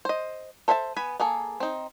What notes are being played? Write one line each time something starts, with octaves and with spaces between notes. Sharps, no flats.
C5 D#5
A4 C5 E5 G#5 A5
B3 G#5 B5
A#3 G#4 A4
C4 D#4